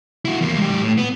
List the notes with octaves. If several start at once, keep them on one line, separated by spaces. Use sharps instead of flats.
E4 F#4
E2 A#3
G#2 G4
A2
B3